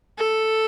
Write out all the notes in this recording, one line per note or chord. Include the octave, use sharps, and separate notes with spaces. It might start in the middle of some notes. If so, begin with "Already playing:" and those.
A4